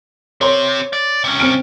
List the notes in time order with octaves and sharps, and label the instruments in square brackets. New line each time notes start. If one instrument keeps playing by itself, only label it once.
[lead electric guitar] C4 G4 [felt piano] C#5 C6
[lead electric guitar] D5
C3 C#4
[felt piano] C4 F6 D7